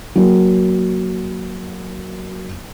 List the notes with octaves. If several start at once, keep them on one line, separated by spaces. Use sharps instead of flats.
F#3 A#3